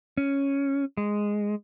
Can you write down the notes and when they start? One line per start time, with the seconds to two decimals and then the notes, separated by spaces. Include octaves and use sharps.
0.17 C#4
0.97 G#3